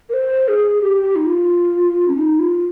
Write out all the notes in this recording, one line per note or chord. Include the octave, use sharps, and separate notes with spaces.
A#4
C5
G#4
G4
G4
D#4
F4
C#4
D#4
F4